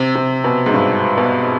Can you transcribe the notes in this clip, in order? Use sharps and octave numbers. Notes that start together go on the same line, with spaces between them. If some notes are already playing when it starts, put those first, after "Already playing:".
Already playing: C3
C3
B2
G#2
G2
B2